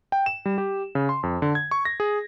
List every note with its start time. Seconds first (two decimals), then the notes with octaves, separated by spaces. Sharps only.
0.12 G5
0.26 E7
0.46 G3
0.58 G4
0.95 C#3
1.09 C6
1.23 F2
1.42 D3
1.55 G#6
1.71 C#6
1.85 A#6
2.00 G#4